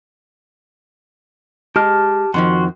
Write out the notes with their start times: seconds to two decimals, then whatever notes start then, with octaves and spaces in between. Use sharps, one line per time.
1.76 G#3 G4 A5 F6
2.34 F2 D#3 F3 F#4 C6